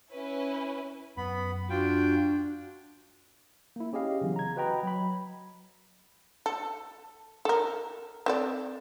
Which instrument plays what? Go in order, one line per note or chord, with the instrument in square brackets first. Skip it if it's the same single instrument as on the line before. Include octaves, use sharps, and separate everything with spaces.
[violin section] C#4 E4 B4
[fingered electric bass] F#2 [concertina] B3 B5
[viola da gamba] D4 [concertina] F4 G5 [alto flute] F#4
[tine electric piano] A#3 E4
C#4 G4 G#4 D#5 F5
C#3 E3 F#3 B3
A#5 G#6
F#4 B4 D#5 G5 A#5 B5
F#3 B5
[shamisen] A4
A4 A#4
C4 A4 D5